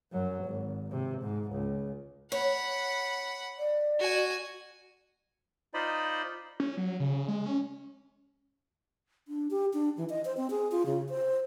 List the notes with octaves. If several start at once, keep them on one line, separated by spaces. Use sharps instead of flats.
F#2 F#3
G#1
C3
G#2
C#2
C#5 F#5 B5
D5
F#4 G#5
D#4 F4 C5 D5 D#5 B5
C#4
F#3
C#3
G#3
C#4
D4
G4
D4
E3
D#5
C5
C4
G#4
F4
C#3
C5